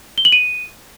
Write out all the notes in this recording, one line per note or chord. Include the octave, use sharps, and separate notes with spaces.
G7
F#7
D#7